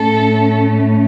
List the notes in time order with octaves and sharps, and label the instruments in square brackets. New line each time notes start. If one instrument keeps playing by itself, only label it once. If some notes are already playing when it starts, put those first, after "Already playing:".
Already playing: [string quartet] A2 A3 C#4 A4